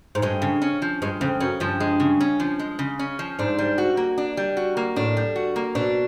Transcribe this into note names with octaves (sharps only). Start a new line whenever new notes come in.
G#2
G2 G#3
C#3
C#4
F3
G2 G#3
F2 C#3
F#2 C#4
G2 F3
G#3
C#3
C#4
F3
G#3
C#3
C#4
F3
G#2 D4
G3
F#4
A#3
D4
G3
F#4
A#3
A2 D4
G3
F#4
A#3
B2 D4